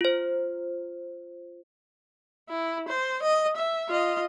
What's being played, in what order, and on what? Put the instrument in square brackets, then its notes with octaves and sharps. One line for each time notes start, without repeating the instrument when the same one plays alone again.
[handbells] F4 C5
[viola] E4
C5
D#5
E5
F4 D#5